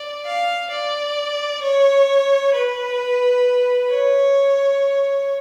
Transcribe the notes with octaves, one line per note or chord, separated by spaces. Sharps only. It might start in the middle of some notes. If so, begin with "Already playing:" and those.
Already playing: D5
F5
D5
C#5
B4
C#5